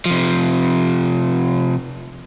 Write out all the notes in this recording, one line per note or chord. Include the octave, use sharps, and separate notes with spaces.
C3 F3